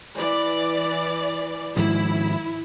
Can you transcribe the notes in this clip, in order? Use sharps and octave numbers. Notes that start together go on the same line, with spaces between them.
E3 D5
G#2 D#3 F3 E4